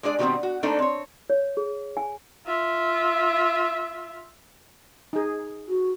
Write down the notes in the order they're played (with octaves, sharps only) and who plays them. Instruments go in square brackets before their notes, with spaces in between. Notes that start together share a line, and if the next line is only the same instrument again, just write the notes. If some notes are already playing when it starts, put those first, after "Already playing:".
[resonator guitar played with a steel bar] G#3 D4 G#4 D5
B2 D#3 G3 A3 B3 C4
F#4
A3 A#3 C4 D4 D#4 A4
C4 C#5
[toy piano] C#5
G#4
G#5
[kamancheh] F4 E5
[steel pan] D#4 G#4
[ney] F#4